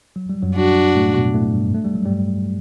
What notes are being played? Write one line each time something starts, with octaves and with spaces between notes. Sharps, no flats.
F#3
G3
F#2 F#3
D4 F#4
A2 A3
B2 B3
A2 A3
G2 G3
A3
G3
F#3
G2 G3